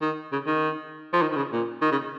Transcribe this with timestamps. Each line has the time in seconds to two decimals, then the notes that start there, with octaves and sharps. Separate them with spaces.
0.01 D#3
0.32 C#3
0.47 D#3
1.13 F3
1.22 D#3
1.32 D#3
1.36 C#3
1.52 A#2
1.82 D#3
1.91 C#3